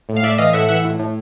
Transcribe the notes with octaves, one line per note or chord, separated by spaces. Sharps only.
A2
F5
A2 D5 E5
E3 D#5 F5
A2 E5 F#5
E3 E5 F#5
A2
A2